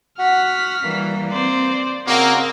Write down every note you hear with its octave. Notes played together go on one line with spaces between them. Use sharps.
F#4 F#5 F6 B6
E3 G3 A#3
C4 C5 D5
C#3 A#3 C4 F#4 D#5